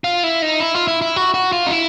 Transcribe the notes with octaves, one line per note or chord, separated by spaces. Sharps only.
F4
E4
D#4
E4
F4
E4
E4
F#4
F#4
F4
D#4
E4